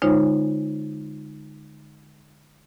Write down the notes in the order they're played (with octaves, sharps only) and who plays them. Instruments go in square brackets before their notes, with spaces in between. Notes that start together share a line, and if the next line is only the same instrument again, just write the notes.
[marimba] D3 G#3 D#4 F4 C5 C#5